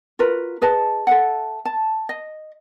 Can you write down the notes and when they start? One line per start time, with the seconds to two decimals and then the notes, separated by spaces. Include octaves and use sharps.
0.19 F4 F#4 A#4 B4
0.61 G#4 B4 D#5 A5
1.07 A4 E5 F#5
1.65 A5
2.09 D#5